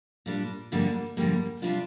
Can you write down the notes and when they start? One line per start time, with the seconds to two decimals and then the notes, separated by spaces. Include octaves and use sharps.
0.26 A#2 G3 D4
0.72 F2 D3 G3 A#3 D4
1.17 F2 D3 G3 A#3
1.62 C3 G3 D4 F4